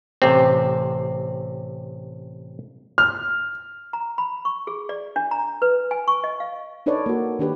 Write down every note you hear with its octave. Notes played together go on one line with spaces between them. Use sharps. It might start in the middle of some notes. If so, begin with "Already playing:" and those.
A1 C3 C4
F6
A#5
B5
C#6
G#4
D5
D4
A#5
B4
G#5
C#6
D#5
F5
D4 D#4 A4 B4 C#5 D5
A#3 F#4
D#3 D4 G4 B4